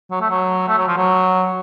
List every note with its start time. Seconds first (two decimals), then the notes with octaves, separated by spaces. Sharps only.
0.11 F#3
0.21 A3
0.31 F#3
0.68 A3
0.78 F#3
0.88 F3
0.97 F#3